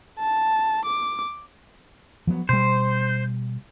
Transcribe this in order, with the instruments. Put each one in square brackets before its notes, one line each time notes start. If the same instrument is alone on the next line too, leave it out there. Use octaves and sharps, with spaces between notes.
[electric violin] A5
D6
[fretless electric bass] F3 F#3 B3
[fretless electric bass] B2 G3 [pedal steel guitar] C5